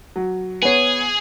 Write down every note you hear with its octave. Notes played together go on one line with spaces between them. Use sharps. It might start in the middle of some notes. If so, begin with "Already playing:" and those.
F#3
B3 G#4 C#5